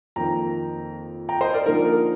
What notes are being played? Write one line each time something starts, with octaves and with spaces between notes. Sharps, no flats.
F2 D#3 A#3 G5 A#5
G5 A#5
C5 D#5
A#4 D5
D3 F3 A#3 D#4 A#4